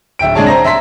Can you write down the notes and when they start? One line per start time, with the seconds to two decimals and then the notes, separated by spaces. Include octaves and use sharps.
0.19 D1 E5 G5 D7
0.35 C2 G#3 D4 G#4 C#5 A5
0.47 C5 A#5 A#6
0.64 E5 A#5 C6 B6